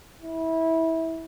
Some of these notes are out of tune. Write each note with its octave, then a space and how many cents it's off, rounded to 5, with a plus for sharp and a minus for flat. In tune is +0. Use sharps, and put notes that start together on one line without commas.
E4 -20